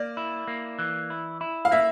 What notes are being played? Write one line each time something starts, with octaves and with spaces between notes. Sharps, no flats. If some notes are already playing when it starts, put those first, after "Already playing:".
Already playing: A#3 D5
E4
A#3
E3
E4
E4
F5
A#3 E5